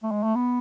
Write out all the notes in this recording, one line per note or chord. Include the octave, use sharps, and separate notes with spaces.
A3
G#3
A3
B3